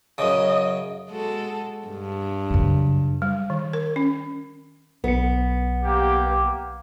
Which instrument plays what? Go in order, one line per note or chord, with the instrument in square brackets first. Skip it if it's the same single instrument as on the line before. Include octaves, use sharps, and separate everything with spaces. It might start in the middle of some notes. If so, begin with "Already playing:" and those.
[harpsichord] F#2 C#3 [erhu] D#5
[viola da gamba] G#3 F#4 A4
G2
[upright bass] F#2 C#3
[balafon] G3
D#3
A#4
C#4
[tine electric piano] B1 C#7 [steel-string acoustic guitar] B3
[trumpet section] A#3 G4